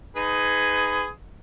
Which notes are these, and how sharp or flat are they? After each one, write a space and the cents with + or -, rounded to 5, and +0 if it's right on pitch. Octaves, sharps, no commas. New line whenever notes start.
D#4 +0 G#4 +0 B4 +30